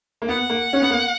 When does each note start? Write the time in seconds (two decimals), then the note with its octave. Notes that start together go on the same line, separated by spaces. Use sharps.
0.22 A#3
0.29 B3 F#5
0.50 A#3
0.73 C#4
0.82 B3
0.90 A#3